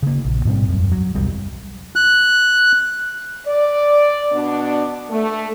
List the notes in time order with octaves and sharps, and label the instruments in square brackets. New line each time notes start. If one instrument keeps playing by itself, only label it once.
[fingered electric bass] C#3 A#3
A#1
G#2 B2 G3 C4
E1 F#2
F#3
E1 C2 G3
[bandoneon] F#6
[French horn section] D5
B2 B3 D4
A3